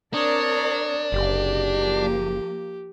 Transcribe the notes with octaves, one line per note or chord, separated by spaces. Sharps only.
C4 D4 A#4 C#5 D5 D#6
F#1 C3 G4
F3 A#3